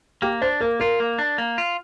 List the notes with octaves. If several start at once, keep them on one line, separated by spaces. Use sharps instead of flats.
A#3 G4
D4 C5
A#3 A#4
F4 A#4
A#3
D4
A#3
F4